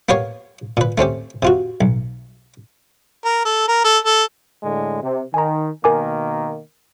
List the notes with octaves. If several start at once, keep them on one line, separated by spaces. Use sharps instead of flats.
A#3 B3 G4 A#4 C#5 F5
A#2 B4
A3 C4 C#4 G4
C3 F4 F#4
B1
A#4
A4
A#4
A4
A4
A2 D3 G#3
C3
D#3 G#5 A#5
B2 D#3 A#3 A#4 G#5 D6